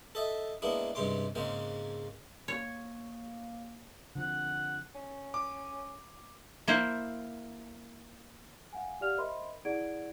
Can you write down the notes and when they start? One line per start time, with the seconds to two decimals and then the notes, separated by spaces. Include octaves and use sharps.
0.15 A4 D#5 E5
0.62 G#3 A#3 B3 D4 E4
0.95 G2 C3 G#3 C#4 C6 D6
1.35 G#2 C#3 G#3 A#3 C4 C#4
2.48 A#3 C#5
4.15 D3 F3 C4 F#5
4.95 C#4
5.34 D6
6.68 A#3 E4 C5
8.73 F5 F#5 G#5
9.01 G4 D5 F5 F#5 F6 F7
9.17 A#4 C5 D#5 E5 B5 C6
9.65 E4 G#4 D5 F#5 G#6 D7